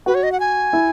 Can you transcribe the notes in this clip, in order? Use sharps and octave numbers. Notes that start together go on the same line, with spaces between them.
F#4 B4
C#5
D#5
F#5
G#5
E4